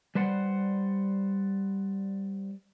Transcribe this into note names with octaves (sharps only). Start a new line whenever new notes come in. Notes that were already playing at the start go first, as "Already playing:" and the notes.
G3 B4 C5 D5 F#5